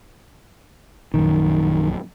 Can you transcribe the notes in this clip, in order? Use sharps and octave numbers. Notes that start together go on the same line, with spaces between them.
A#1 F#2 D#3